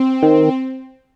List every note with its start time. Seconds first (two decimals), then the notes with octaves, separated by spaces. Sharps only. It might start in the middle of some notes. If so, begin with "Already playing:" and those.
Already playing: C4
0.22 D#3